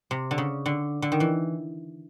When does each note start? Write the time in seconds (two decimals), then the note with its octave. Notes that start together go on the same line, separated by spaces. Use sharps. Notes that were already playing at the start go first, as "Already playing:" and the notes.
0.11 C3
0.31 D3
0.38 C#3
0.66 D3
1.02 D3
1.12 D#3
1.20 E3